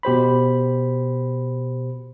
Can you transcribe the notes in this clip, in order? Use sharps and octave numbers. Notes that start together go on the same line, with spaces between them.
B2 G4 C5 B5